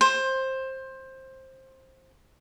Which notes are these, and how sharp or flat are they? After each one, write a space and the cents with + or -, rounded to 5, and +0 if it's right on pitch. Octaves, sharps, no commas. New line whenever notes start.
C5 +15